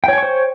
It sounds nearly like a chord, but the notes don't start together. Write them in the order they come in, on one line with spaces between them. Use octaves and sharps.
G5 C#5 G#5 C#6 C5